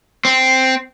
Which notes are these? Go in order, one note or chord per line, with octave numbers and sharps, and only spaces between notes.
C4